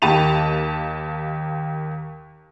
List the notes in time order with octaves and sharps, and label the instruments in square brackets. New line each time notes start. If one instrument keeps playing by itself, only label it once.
[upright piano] D#2 A#3 G4 A5 D#7 F7